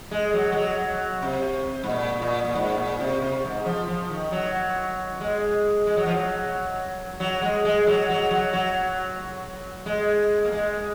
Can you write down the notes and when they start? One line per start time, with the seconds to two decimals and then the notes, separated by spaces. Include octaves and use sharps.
0.11 G#3
0.33 F#3
0.52 G#3
0.57 F#3
1.22 C3
1.84 G#2
1.89 A#2
2.22 A#2
2.45 A#2
2.55 G#2
2.77 A#2
3.00 C3
3.22 C3
3.45 G#2
3.66 F3
3.88 F3
4.10 D#3
4.32 F#3
5.21 G#3
5.87 G#3
5.97 F#3
6.06 F3
6.14 F#3
7.20 F#3
7.42 G#3
7.65 G#3
7.87 F#3
8.09 F#3
8.31 F#3
8.53 F#3
9.86 G#3
10.45 A#3
10.52 G#3